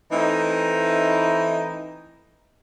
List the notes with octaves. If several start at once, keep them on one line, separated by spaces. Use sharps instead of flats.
E3 A3 C4 D#4